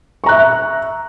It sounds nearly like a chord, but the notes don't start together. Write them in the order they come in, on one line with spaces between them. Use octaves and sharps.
C#6 A#5 F#6 E5